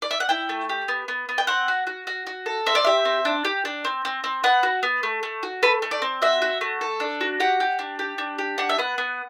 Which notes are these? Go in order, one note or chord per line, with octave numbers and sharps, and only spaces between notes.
D5
E5
F#5
E4 G5
A3
G4
B3
B3
B3
G5
C4 F#5
F#4
F#4
F#4
F#4
A4
C4 E5
D5
G4 E5
C4
D4
G4
D4
C4
C4
C4
B3 F#5
F#4
B3
A3
A3
F#4
A3 B4
A3
D5
C4
F#4 E5
F#4
A3
A4
D4
F#4
G4 F#5
G4
D4
G4
D4
G4
D4 F#5
E5
B3 F#5
B3